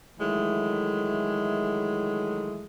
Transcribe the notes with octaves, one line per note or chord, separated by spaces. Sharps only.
D#3 E3 F#3 G#3 A3